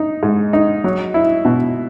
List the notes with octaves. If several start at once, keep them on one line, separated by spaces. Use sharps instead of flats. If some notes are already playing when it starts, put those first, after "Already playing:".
Already playing: D#4
G#2
D#4
F#3
E4
B2